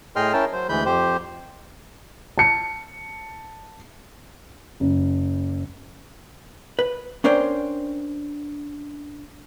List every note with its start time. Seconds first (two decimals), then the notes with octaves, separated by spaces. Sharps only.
0.16 A2 G#4 D#5 G5 C6 F6
0.33 C#4 E4 A#4 G5 A5
0.53 F#3 C5
0.69 D2 E3 G#3 B5 G6
0.86 F2 G4 C5
2.38 A5 C#7
4.80 F#1
6.79 B4
7.24 C#4 D4 A#4 C5 G5